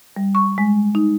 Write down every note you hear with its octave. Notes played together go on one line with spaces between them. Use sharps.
G3
C#6
G#3
D#4